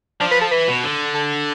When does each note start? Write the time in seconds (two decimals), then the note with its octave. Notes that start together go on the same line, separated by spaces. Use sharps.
0.20 F3 D4
0.31 B4
0.41 A4
0.51 E3 B4
0.68 B2
0.84 D3
1.14 A4